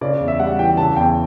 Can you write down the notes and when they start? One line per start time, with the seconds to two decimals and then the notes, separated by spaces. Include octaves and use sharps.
0.01 C#3 D5
0.20 E2
0.28 E5
0.39 G3 F#5
0.59 E3 G5
0.77 C#3 A5
0.97 E2 G5